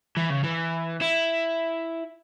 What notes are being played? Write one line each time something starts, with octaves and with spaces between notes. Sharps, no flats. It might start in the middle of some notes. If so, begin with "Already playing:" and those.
E3
C#3
E3
E4